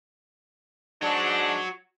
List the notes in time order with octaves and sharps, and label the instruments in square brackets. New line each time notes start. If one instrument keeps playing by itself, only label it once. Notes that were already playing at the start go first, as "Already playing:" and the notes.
[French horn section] G#2 D4 [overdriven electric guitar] F#4 C#5